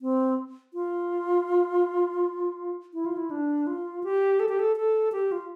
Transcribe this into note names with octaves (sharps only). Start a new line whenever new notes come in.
C4
F4
E4
F4
E4
D4
F4
G4
A4
G4
A4
A4
G4
F4